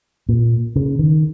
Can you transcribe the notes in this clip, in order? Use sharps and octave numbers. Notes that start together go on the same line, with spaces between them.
A#2
C#3
D#3